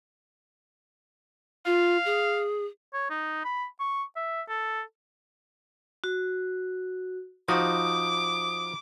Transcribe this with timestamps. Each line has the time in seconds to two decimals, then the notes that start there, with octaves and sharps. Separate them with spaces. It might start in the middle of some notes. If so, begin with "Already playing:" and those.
1.66 F4 F5
2.05 G#4
2.94 C#5
3.10 D#4
3.45 B5
3.80 C#6
4.16 E5
4.48 A4
6.04 F#4
7.48 F3 D#4 F#4 D6 D#6